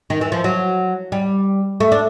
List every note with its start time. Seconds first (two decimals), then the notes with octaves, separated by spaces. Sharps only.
0.10 D#3
0.21 E3
0.32 F3
0.44 F#3
1.12 G3
1.80 A3
1.92 D4